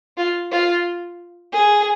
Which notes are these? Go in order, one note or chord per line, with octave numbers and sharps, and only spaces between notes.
F4
F4
G#4